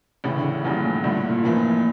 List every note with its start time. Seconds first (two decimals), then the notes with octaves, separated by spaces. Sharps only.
0.24 A1 A2 C#3 E3
0.35 D3
0.43 C#3
0.64 F1 E2 A#2 C#3 G3
0.84 A2
1.03 G2 A#2 D3 A3
1.17 A2
1.30 A#2
1.43 F1 F2 A#2 E3 A#3